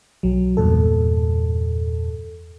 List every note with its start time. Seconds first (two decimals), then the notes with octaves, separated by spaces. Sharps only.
0.23 B1 F#3
0.57 E2 G2 A#2 A4